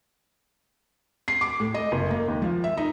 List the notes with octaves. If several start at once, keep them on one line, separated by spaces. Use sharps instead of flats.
C7
D6
A2
D#5
F#1
A#3
D#2
F3
E5
D#4